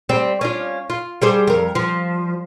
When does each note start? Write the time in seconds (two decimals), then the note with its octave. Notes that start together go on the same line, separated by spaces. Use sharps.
0.09 G3 C4
0.41 C#4 D4 F4
0.90 F4
1.22 G3 G#4 C5
1.47 F2 A#4
1.75 F3